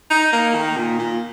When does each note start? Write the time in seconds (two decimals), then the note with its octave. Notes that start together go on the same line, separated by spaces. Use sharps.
0.11 D#4
0.33 A#3
0.55 D#3
0.77 A#2
0.99 A#2